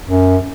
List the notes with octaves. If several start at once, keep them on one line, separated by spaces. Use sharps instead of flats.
F#2